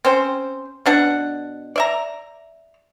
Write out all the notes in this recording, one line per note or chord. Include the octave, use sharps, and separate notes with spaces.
C4 C#4 C5
B2 D4 F#5
D5 E5 A#5